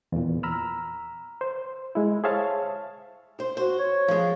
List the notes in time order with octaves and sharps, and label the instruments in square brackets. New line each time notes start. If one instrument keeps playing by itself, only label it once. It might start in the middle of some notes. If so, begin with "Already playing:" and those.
[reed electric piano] E2 A#2
A#5 B5 E6 F6
C5
G#3 E4
G#4 C5 C#5 E5 F5 A5
[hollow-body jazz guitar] C5
[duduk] F#4 [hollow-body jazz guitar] C5
[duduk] C#5
[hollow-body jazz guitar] F3 G#3